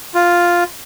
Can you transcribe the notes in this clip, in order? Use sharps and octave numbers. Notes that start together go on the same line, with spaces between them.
F4